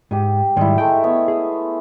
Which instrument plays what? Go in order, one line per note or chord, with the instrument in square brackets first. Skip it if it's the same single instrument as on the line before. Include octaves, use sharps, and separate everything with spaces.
[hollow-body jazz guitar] G#2 [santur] G4 D#6
[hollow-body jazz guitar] G#2 D#3 G3 [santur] E4 C6
[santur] G#3 A3 [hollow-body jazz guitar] G5
[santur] B3 C#5
[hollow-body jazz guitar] G#4